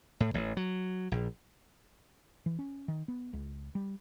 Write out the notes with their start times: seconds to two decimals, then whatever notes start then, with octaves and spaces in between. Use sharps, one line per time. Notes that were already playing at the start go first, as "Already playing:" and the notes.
0.20 A2
0.34 A1
0.57 F#3
1.12 A#1
2.46 E3
2.59 C#4
2.88 D#3
3.08 B3
3.33 C#2
3.75 G3